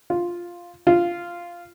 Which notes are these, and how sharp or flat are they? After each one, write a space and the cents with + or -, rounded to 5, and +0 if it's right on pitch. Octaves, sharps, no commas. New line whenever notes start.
F4 +0
F4 -10